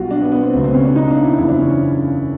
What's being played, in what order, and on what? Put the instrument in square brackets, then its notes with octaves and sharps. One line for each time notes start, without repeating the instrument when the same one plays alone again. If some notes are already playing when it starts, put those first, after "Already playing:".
Already playing: [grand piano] B1 B2 G3 F4 F#4
D4
B3
B3
C4
C#2 C#3 F#3 A3 B3
C4
C#4
D4
D#4
D4
E4
F#1 E2 C#3 F3 E4
D4
C#4
C#4